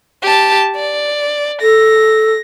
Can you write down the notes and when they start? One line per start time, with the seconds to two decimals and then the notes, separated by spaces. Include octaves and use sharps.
0.22 G4 A5
0.76 D5
1.62 A4 A#6